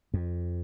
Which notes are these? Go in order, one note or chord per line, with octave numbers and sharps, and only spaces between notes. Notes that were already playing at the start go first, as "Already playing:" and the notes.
F2